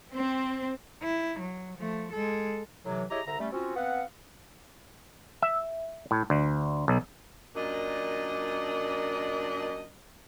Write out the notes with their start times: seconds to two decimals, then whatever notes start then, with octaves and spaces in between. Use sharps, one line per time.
0.13 C4
1.02 E4
1.40 F#3
1.77 F3 A3
2.13 G#3 A4
2.85 A2 C3 E3 F#3
3.11 E4 G4 G#4 C#5 D#5 A#5
3.26 C2 D3 E5 A#5
3.40 G3 A3 C#4
3.52 C4 C#4 F4 F#4
3.76 B3 C4 F5 F#5
5.42 E5
6.11 A2
6.30 D2
6.88 B1
7.55 F#2 A#2 D4 D#5